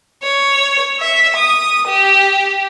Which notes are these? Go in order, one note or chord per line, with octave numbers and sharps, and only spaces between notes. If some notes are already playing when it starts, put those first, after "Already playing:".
C#5
E5
D#6
G4